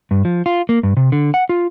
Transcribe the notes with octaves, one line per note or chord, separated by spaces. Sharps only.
G2
F3
F4
A#3
G2
C3
D3
F#5
F4